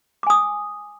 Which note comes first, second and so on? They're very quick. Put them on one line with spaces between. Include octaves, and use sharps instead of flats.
D6 G#5 D#6